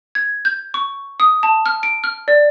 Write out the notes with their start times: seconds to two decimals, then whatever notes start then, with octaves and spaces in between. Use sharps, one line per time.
0.15 G#6
0.45 G6
0.74 C#6
1.20 D#6
1.43 A5
1.66 F6
1.83 D7
2.04 F6
2.28 D5